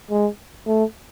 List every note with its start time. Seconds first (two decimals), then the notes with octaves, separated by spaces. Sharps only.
0.10 G#3
0.67 A3